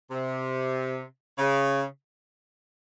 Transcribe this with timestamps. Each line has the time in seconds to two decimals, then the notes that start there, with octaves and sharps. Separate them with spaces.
0.11 C3
1.39 C#3